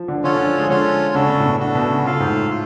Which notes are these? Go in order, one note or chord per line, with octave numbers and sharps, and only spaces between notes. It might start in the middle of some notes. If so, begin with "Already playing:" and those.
Already playing: F3
D3
D3 C#4 F4 A4 C#5
D3
F3
G#3
D3 C#4 F4 A4 C#5
C#3 D4 F#4 A4
C#3
A2
B2
D4 F#4 A4
B2
C#3
C#3 F4 A4 F5
G#2
A2
F4